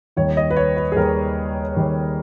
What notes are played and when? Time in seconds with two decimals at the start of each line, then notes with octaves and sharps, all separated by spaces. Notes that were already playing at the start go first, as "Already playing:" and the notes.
0.16 D#2 D#3 G3 C#5
0.37 D#5
0.51 B4
0.56 C#5
0.76 B4
0.92 G#4
0.96 D#2 D#3 G3 A#4
1.76 D#2 D#3 G3